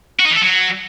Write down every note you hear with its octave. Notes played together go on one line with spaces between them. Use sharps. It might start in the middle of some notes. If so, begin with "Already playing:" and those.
F#4
D#4
E3
A4
F#3